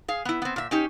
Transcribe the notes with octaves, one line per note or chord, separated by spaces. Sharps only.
G#4 F5
B3 E4
B3 C4
A#2 E5
C#4 D#4 G4